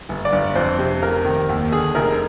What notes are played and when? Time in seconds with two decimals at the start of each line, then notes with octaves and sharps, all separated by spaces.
0.09 G1
0.25 D5
0.32 G1
0.55 F2 C5
0.79 C3
1.02 F1 A#4
1.25 D#3
1.49 D#2
1.72 D3 G#4
1.95 F1 A#4